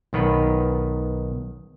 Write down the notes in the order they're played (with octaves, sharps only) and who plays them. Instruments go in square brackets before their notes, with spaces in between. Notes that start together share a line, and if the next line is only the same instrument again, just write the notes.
[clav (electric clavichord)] B1 D#3 B3 B4